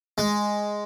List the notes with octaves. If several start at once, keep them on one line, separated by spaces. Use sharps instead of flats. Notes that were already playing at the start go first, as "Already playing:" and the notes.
G#3